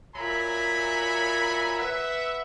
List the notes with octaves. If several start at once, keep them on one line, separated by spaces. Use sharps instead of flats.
A#2 F#3 E5 G#5 A#5 B5
B4 E5 F#5